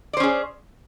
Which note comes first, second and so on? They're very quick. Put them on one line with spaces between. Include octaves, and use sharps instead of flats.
D5 C5 C#4 G#4